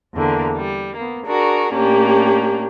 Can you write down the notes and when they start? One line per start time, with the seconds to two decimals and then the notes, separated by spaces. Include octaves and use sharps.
0.15 E2 D3 A#3
0.55 G3
0.95 A#3 B3
1.26 D4 F#4 G#4 A#4
1.73 A2 A#3 C#4 D4 G4